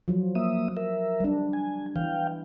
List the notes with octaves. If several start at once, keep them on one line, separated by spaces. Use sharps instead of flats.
F3 F#3
A#3 E5 D#6
A#4 E5
G3 D4
G#5
E3 F5 G5